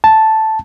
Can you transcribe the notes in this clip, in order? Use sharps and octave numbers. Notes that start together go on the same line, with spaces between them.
A5